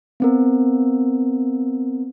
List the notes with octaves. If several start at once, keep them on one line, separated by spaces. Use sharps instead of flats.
B3 C4 A#4